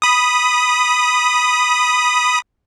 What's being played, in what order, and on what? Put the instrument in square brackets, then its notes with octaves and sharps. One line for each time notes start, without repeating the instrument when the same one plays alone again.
[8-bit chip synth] B5 D#6